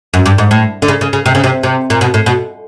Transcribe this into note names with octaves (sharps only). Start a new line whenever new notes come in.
F#2
G2
G#2
A2
D3
C#3
C#3
C#3
C3
C#3
C3
C3
A#2
B2
A2
B2